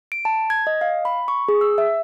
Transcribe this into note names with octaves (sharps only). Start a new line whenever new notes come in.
D7
A5
G#6
D#5
F5
B5
C#6
G#4
E6
E5